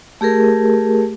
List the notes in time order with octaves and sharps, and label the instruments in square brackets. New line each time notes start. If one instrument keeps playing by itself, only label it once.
[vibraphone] A3 G4 G#4 A#4